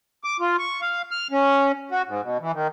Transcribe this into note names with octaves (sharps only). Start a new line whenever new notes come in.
D6
F4
C#6
F5
F6
C#4
F#4
G#2
B2
E3
D#3